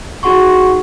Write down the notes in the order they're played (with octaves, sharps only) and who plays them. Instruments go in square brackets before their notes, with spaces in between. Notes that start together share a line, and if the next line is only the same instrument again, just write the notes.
[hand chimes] D#4 F#4 G#4 F#5 C6 C#6